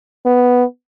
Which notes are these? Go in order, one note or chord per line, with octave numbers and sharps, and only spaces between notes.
B3